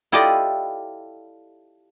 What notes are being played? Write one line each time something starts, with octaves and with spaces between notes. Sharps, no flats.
E4 F4 G4 A4 D5 D#5